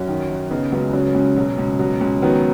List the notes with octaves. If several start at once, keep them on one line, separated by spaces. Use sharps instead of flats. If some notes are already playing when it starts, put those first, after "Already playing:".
Already playing: F#2 C#4 F#4
D#3
F#2
C#3 B3 D#4
C#2 F#3 B3
C#3 F#3
C#2
B2 F#3
C#2
B2 F#3
C#2
D#3 F#3 B3